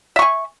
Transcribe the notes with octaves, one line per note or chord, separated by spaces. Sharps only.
E5 G#5 C#6